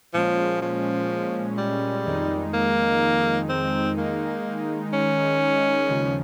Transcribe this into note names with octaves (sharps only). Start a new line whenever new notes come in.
A#2 F3 G#3 C#4
F3
G3
F2 D#3 G#3 D#4
A#3
C4
D#3 G#3 A#3 D#4
C#4
D#2 C#3 F3